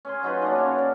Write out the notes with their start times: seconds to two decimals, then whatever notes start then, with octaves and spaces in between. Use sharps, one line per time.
0.05 C#4 G#4 G#5 C6
0.23 F#3 D#4 F4 B4
0.42 A#3 C#4 D4
0.56 F#2 C#4 C#5 F5
0.78 D5